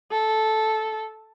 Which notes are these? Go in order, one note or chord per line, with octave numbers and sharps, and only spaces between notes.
A4